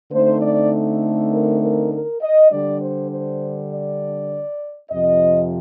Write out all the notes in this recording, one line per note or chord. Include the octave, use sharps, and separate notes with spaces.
D3 A3 C4 D#4 C5
D5
A#4
A#4
A#4
D#5
D3 G3 D4 D5
C5
C5
D5
F2 C3 F3 D#5